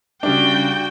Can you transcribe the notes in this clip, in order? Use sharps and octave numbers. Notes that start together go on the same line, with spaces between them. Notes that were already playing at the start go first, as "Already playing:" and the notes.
C#3 G3 D4 F#4 G5